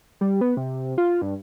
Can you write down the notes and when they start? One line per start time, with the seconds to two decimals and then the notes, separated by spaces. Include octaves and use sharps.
0.21 G3
0.41 B3
0.57 C3
0.98 F4
1.22 G2